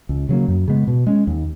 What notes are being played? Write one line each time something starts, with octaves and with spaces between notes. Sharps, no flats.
C#2
C#3 F#3 A#3
F#2
C#3 G#3 B3
B2
G#3 C#4
D#2